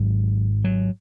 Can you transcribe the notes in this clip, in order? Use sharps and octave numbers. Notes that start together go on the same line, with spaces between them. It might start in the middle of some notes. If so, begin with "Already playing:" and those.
Already playing: G#1 G#2 F#3
F#3